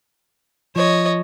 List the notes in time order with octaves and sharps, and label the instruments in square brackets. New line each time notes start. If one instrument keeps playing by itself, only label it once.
[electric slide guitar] F3 [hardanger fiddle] C#5 D#5